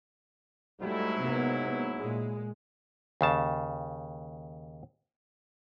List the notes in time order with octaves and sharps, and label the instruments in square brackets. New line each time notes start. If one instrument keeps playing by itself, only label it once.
[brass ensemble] G#2 F#3 E4 [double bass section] G3 A3
[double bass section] C3 A#3 B3
A#2 G#3
[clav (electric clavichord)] D#2 C#3 A5